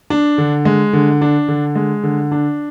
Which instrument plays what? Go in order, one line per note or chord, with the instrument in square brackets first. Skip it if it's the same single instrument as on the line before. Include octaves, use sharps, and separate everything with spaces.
[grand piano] D4
D3
G#3
D3
D4
D3
G#3
D3
D4